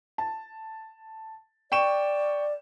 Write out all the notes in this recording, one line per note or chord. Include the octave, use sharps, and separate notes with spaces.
A5
D5 G5 C#6 E7